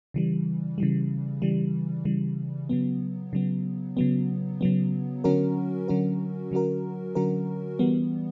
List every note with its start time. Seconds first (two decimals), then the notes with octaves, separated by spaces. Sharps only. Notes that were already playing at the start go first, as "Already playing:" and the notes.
0.14 C#3 E3 G3
0.78 C#3 E3 G3
1.42 C#3 E3 G3
2.05 C#3 E3 G3
2.69 C#3 F#3 B3
3.33 C#3 F#3 B3
3.97 C#3 F#3 B3
4.61 C#3 F#3 B3
5.24 D3 F#3 C#4 F#4 A#4
5.88 D3 F#3 C#4 F#4 A#4
6.51 D3 F#3 C#4 F#4 A#4
7.15 D3 F#3 C#4 F#4 A#4
7.79 E3 G3 B3